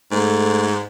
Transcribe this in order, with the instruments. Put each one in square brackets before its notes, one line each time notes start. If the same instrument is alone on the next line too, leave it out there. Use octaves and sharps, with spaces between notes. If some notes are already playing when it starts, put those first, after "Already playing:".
[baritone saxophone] G#2 [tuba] A3